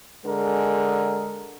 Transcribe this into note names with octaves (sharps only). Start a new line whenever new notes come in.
D3 G#3 G#4 A#4